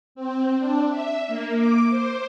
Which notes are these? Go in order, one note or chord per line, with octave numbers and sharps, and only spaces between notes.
C4
D4
E5
A#3
D6
C5